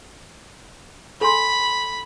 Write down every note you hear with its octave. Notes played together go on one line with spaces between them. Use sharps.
A4 G#5 B5 C6